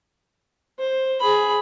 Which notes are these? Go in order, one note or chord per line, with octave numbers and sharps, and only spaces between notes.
C5
G#4 B5